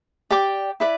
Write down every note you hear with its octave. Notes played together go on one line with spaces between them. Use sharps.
G4 D5 G5 D6
E4 B4 D5